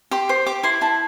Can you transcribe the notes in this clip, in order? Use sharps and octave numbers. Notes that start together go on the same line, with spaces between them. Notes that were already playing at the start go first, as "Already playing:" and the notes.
G4 C6
C5
G4 D6
E4 C6
E4 A5